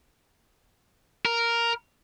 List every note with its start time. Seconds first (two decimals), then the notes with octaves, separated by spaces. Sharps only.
1.25 A#4